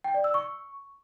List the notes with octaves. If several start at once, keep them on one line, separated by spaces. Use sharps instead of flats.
G5
D5
E6
C#6